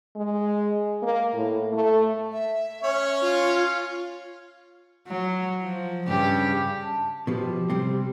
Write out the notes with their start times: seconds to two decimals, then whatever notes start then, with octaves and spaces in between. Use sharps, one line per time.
0.16 G#3
1.02 A#3
1.34 A2
1.72 A3
2.32 E5
2.83 C#4 C#5
3.22 F4
5.08 F#3
5.61 F3
6.07 G2 C#3 G4
6.82 A5
7.27 B2 F3 G4
7.70 C3 G3 C4